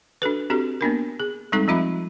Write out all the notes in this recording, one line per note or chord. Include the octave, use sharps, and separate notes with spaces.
D4 F#4 A4 B4
C4 D4 F#4 G4 A4
A#3 B3 D4 A#4
G#4
G3 G#3 C4 D#4 A4
F3 C4 F4 E5 B5